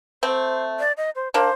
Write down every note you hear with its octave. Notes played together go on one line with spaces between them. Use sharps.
A3 C4 C5
D5
D#5
C5
A#3 D4 C5